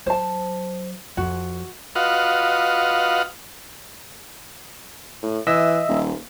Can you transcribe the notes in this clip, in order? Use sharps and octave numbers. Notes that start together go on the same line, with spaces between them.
F#3 C5 A5
F2 F#4
F4 F#4 B4 D#5 F5 F#5
A2
E3 D#5 E5 E6
D#1